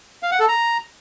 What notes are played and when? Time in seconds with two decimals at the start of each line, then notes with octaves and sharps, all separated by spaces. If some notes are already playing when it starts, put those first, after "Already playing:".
0.23 F5
0.31 F#5
0.40 A4
0.48 A#5